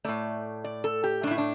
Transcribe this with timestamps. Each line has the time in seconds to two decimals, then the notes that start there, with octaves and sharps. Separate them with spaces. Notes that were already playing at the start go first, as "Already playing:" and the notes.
0.04 A2 A3 D5
0.64 D5
0.84 A4
1.04 G4
1.23 A3 D4
1.27 A2 E4
1.38 D4